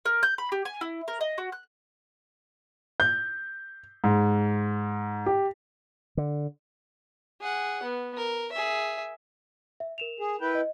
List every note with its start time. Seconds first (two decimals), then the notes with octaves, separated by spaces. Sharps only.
0.05 A#4
0.23 G6
0.38 B5
0.52 G4
0.65 G#5
0.81 E4
1.08 A#4
1.21 D#5
1.38 F#4
1.52 F#6
3.00 G6
4.04 G#2
5.26 G4
6.17 D3
7.41 G#4 F#5
7.83 B3
8.17 A#4
8.52 G#4 E5
9.80 E5
9.98 A#4 E7 F7
10.20 G#4
10.41 E4 B4 G5
10.55 D#5